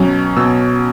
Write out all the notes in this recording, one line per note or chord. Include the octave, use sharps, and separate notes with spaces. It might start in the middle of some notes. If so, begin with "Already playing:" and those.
Already playing: B2 F#3 C#4
B2 E6